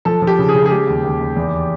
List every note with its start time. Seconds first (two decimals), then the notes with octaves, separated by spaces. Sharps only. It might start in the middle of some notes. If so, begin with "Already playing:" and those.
0.05 F3 A4
0.22 F3
0.27 G4
0.39 C#3
0.49 G#4
0.55 C#3
0.66 G#4
0.71 G#3 G4
0.87 D#2
1.04 D#2
1.21 D#2
1.36 E2